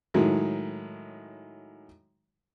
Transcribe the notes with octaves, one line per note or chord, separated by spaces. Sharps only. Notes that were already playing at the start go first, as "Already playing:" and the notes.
A2 D#3 F#3 G#3